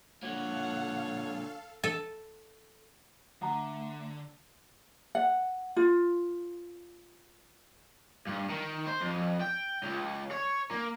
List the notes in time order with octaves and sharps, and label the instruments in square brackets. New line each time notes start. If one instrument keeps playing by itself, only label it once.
[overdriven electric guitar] A#2 D3 [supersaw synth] A4 F5 [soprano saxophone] C#5 [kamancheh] F#5
[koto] A4
[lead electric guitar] D3 [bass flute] A3 [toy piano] F#5 A#5
[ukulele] F#5
F4
[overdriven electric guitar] G2
D#3
C5
F2
G5
C#2
C#5
A#3